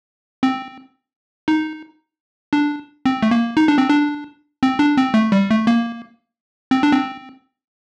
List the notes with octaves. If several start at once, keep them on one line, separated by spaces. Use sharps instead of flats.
C4
D#4
D4
C4
A3
A#3
D#4
D4
C4
D4
C4
D4
C4
A3
G3
A3
A#3
C4
D4
C4